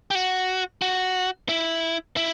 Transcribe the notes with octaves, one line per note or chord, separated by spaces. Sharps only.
G4
F#4
F#4
E4
E4